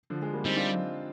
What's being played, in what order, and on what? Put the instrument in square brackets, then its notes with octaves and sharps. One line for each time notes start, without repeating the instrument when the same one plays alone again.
[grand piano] D3 F3
F3 G#3
G3 A#3
[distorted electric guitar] G3 [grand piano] C4 D#4
[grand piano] D4 F4